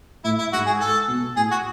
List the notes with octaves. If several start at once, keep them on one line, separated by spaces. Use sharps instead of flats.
A2 E4
E4
G#2 F#4
G#4
A4
B2
A2 G#4
F#4